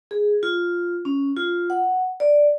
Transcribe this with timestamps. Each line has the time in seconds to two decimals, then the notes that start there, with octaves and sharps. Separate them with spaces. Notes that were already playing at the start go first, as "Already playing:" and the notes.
0.11 G#4
0.43 F4
1.05 C#4
1.37 F4
1.70 F#5
2.20 D5